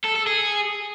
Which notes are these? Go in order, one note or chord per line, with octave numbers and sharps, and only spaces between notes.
A4
A4
G#4